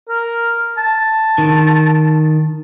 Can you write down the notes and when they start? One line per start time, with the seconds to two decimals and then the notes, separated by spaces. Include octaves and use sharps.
0.09 A#4
0.78 A5
1.38 D#3